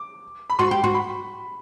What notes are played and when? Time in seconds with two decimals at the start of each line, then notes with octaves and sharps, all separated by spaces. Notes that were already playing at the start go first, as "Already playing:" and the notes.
Already playing: D6
0.50 B5
0.59 F#4 C6
0.71 G4
0.83 F#4 C6
0.94 B5